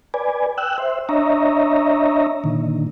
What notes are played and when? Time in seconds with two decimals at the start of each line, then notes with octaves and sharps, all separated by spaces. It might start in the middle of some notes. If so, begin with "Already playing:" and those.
0.14 B4 D5 G#5
0.58 G5 E6 F#6
0.78 C5 E5
1.09 D4 C#5 D#5 E5 A#5
2.44 A#2 D3 D#3